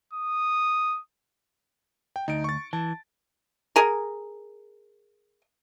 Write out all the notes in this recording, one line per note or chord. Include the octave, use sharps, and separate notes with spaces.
D#6
G5
D2 D#4 D7
C#6 A6
E3 A5
G#4 A#4